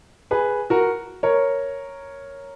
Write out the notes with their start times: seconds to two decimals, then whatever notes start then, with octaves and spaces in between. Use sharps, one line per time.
0.31 G#4 B4
0.70 F#4 A#4
1.23 A#4 C#5